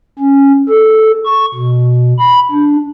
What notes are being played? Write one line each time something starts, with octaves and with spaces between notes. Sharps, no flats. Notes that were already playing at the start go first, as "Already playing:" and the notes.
C#4
A4
C#6
B2
B5
D4